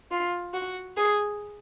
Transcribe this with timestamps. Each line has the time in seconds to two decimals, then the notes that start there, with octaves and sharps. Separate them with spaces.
0.10 F4
0.54 F#4
0.96 G#4